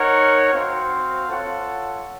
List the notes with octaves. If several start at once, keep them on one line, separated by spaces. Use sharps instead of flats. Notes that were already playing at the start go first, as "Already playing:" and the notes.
Already playing: D#4 A#4 C#5 F#5
C4 F#4 C5 F5
F4 A4 C#5 F#5